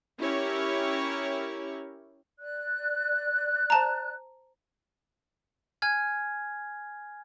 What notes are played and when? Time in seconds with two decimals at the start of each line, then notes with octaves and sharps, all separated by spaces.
0.20 C#4 E4 G4 A#4 C#5
2.39 D5 F#6
3.70 C5 A5 A#5
5.82 G#5 F6 G#6